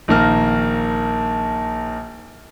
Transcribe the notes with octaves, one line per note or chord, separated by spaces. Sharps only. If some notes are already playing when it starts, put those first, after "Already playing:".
A#1 D#3 A#3 F6